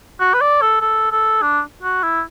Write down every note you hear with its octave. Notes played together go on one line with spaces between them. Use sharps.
F#4
B4
D5
A4
A4
A4
D4
F#4
E4